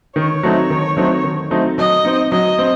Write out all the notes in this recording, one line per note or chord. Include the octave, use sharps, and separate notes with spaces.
D#3 C#5
F#3 A3 C4 D#4
D#3
F#3 A3 C4 D#4
D#3
F#3 A3 C4 D#4
F#3 D#5
C4 D#4
F#3 D#5
C4